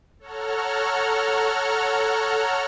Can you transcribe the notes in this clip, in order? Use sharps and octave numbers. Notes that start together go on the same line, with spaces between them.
A4 C#5 F#5 A#5 F6